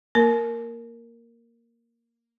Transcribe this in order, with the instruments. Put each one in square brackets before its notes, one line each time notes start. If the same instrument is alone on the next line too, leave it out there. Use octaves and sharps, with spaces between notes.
[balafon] A#3 A#4